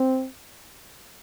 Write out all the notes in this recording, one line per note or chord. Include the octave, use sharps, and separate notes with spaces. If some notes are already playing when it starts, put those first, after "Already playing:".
Already playing: C4